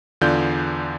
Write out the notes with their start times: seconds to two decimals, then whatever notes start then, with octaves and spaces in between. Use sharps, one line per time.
0.21 E2 D3 F4 D5 G6